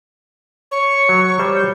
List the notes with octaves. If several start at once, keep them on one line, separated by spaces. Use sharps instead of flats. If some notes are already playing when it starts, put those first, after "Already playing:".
C#5 C#6
F#3
G3 C5 C#5
G6